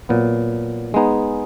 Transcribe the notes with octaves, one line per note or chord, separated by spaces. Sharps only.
A#2 F#3 B3
G#3 B3 D#4 G#4